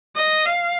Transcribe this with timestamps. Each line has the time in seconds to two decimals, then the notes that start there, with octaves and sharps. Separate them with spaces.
0.16 D#5
0.46 F5